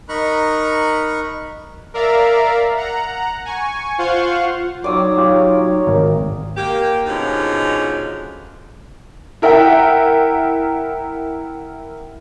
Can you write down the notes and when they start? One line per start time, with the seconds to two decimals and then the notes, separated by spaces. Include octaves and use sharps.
0.09 D#4 A#4 A#5 B5 C#6 F#6
1.94 A#4 D5 E5 F5 A#5
2.77 F#5 A#5
3.45 G#5 C#6
3.98 F4 C5 F5 F#5 C6 C#6
4.84 F#3 D#4 F#4 C#5 D5 D#6 E6
5.18 F4 G4
5.87 G#1 A#4
6.56 A#3 G4
7.06 B2 D3 F3 G#3 C#4 D#4
9.42 E4 A#4 E5 F#5 G5